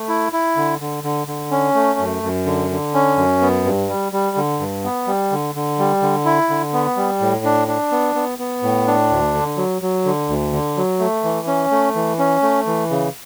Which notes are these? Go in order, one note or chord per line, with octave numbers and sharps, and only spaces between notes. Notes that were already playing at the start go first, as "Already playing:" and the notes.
Already playing: A3
E4
E4
D3
D3
D3
D3
C#4
A3
F#2
F#2
D3
D3
C#4
F#2
B3
G2
G3
G3
D3
G2
B3
G3
D3
D3
G3
D3
E4
D3
B3
G3
A2
D4
D4
B3
B3
B3
A2
D4
D2
D3
F#3
F#3
D3
D2
D3
F#3
A3
E3
C#4
A3
E3
C#4
A3
E3
C#3